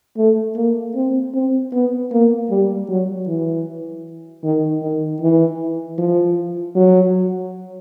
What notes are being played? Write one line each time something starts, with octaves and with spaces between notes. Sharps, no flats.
A3
A#3
C4
C4
B3
A#3
G3
F#3
E3
D#3
D#3
E3
F3
F#3